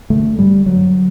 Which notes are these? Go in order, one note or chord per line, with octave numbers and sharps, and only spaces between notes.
D3 A3
G2 G3
D3 F#3